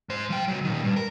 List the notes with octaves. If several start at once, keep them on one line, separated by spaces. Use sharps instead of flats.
G#2 C5
F3 G5
C#2 F#3
A#2 D#3
G2
A#4